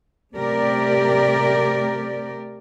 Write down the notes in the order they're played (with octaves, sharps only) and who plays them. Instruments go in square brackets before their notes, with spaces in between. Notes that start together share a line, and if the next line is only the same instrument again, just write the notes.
[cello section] C3 A3 G4 A#4 D5